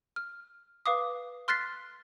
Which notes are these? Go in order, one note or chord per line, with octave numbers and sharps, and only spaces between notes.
F6
B4 F5 D6 D#6
C6 F6 F#6 A6 B6 C7